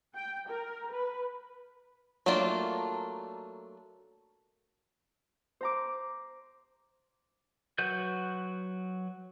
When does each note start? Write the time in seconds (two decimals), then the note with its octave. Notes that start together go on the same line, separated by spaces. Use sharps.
0.16 G5
0.49 A#4
0.92 B4
2.26 F#3 A3 A#3 D4 F4
5.61 C5 A#5 D6
7.78 F#3 F#4 B4 G6